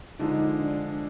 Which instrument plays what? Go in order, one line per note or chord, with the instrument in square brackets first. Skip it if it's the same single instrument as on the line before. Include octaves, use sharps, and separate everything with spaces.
[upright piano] D3 F3 G#3 [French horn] D#4
[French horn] D4